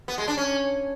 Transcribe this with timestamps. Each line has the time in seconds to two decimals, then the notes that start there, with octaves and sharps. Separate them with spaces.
0.08 B3
0.18 G#3
0.28 D4
0.37 C#4